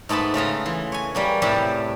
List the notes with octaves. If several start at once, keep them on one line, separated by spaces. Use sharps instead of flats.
G#2 A3 B3 A5 B5
C#3 A3 F4 A#5
E3
C#5 G#5
G3 A#3 C#4
A2 C3 G3 A3 G4 A5